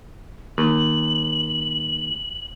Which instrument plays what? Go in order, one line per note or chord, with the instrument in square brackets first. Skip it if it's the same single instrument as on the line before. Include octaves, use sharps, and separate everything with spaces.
[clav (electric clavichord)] D#2 [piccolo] F#7